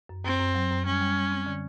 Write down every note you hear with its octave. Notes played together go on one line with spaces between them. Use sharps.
F#2
F#2 C4
F#2
F#3
F#2
G3 C#4
G3
G3
C4
D3